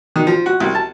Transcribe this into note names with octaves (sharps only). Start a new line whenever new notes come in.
D#3
F3
F#4
C2
A5